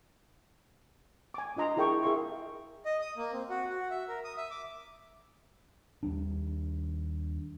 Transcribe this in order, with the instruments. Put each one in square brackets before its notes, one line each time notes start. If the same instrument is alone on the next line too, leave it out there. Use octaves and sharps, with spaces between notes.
[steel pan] G#5 D6
D4 F4 D#5 A#5 C6
E4 G#4 A#4 G5 A5 C#6
G#4 A#4 E5 F5 C6 C#6
[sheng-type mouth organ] D#5
D#6
A#3
C4
F#4
F#4
E5
A#4
D#6
E5
D6
[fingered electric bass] D#2 G3 D4